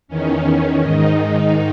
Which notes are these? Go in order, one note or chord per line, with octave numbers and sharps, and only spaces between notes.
E2 D#3 C#4
G#2 D#3 D#4